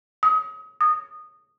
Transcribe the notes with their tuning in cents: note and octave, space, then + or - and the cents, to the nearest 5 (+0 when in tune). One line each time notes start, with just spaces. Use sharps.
D#6 +30
D#6 -10